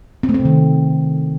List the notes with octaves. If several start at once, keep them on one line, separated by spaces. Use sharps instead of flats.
C4
A3
C4
C3
D#3